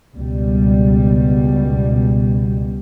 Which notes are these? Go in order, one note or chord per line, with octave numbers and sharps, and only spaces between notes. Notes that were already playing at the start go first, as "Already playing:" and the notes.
C#2 B2 G3